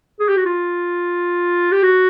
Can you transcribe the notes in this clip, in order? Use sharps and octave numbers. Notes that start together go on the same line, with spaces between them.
G#4
G4
F#4
F4
G4
F#4